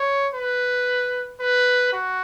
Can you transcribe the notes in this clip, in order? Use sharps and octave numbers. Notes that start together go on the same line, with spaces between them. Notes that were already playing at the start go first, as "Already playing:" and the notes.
Already playing: C#5
B4
B4
F#4